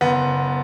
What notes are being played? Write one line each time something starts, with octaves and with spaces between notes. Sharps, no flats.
F#1 B3